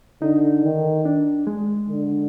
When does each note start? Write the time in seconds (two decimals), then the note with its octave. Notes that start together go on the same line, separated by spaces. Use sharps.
0.22 D3 D#4
0.64 D#3
1.05 D4
1.47 G#3
1.89 D3